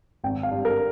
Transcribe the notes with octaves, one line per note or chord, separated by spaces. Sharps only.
G#1 G5
F5
G2
A#4